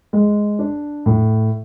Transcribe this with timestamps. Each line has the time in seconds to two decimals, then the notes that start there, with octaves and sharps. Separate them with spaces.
0.13 G#3
0.59 D4
1.06 A2